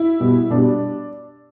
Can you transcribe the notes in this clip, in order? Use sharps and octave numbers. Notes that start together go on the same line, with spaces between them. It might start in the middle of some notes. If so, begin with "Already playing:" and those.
Already playing: E4
B2 G3
B2 G3 D4